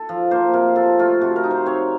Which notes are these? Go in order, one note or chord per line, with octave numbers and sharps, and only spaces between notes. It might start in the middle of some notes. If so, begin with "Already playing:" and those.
Already playing: A4
F3
A#3 C5
C3 A#4
F4 A4
A3 F4
C3 F#4
A#4
D#4
C5
C4 C#5